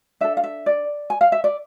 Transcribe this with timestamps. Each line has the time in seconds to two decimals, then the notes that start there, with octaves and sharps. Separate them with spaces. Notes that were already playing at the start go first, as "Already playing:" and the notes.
0.21 D4 A4 E5
0.37 F5
0.44 E5
0.66 D5
1.10 G#5
1.21 F5
1.32 E5
1.44 D5